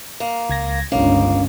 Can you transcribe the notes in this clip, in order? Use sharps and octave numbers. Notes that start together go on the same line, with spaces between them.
A#3
C#2 G#6 A#6
G1 C#2 A#3 C#4 D4